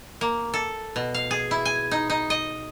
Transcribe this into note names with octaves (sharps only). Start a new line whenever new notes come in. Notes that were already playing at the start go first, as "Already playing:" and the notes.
A#3
A4
B2
F5
G#4
E4
G#5
D#4
D#4
D#5